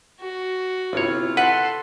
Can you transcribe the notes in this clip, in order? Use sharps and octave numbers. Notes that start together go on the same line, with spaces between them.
F#4
G1 C3 E4 F4 C#5
A4 B4 F#5 C6